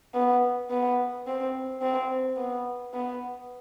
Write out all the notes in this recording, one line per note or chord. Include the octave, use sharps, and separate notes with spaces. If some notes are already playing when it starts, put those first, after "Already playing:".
B3
B3
C4
C4
B3
B3